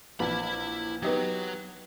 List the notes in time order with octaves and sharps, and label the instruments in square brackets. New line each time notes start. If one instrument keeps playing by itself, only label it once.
[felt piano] A#1 E3 [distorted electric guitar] E4 B5
[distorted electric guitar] F#3 [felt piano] B3 D#4 G4